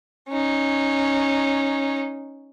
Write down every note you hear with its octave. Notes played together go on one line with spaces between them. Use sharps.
C#4 D#4